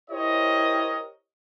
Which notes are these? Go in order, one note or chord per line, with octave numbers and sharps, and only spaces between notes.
E4 G4 A#4 C5 C#5 D#5